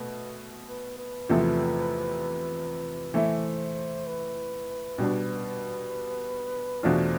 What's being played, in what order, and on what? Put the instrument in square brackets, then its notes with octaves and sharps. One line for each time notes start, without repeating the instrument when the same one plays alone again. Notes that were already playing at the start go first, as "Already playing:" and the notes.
Already playing: [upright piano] B2 A3 [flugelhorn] B4
[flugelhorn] B4
B4
[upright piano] E2 C3 F3 A3
[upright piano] E3 A3 E4 [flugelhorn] C5
[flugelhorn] B4
[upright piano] B2 G3 D4
[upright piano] E2 B2 A3 D4 F4 [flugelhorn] C5